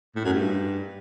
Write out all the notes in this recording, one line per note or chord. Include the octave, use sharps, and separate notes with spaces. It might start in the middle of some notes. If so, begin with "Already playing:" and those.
A2
F#2
G2